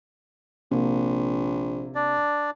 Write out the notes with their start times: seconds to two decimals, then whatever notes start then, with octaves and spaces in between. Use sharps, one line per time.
0.71 A#1 C3 A#3
1.95 D4 D5